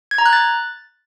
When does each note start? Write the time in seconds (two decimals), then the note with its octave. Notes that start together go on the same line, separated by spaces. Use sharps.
0.11 G#6
0.18 A#5
0.26 F#6
0.33 A6